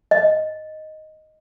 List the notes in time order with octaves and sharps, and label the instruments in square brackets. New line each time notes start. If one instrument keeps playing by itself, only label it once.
[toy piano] D#5